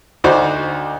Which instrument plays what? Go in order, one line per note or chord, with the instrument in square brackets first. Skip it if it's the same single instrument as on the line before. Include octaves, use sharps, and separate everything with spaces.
[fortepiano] D2 D4 D#4 F#4 C5 D6